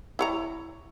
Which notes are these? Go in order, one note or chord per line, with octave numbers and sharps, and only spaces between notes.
E4 C#5 A#5